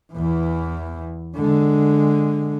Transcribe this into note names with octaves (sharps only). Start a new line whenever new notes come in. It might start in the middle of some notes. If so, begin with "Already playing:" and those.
E2 E3
D3 G#3